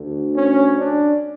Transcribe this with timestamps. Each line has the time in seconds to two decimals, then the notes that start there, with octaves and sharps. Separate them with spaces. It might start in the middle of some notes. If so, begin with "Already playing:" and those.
Already playing: D2 D3
0.36 C#4
0.78 D4